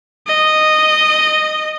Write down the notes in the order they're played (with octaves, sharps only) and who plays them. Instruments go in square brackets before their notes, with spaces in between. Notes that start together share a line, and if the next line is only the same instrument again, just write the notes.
[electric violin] D#5